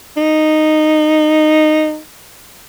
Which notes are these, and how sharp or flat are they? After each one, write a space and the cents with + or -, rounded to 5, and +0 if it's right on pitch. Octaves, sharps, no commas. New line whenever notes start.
D#4 -10